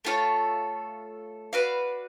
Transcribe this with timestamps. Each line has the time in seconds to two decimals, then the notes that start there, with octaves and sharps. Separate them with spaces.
0.05 A3 F4 A4 C#5
1.53 F#4 B4 D5 F5